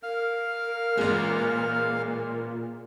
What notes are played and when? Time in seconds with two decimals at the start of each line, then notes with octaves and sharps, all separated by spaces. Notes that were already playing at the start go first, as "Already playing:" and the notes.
0.03 A#4 F5 F6
0.97 A1 A#2 G#3